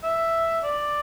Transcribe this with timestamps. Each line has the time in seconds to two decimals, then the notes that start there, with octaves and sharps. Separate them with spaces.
0.03 E5
0.63 D5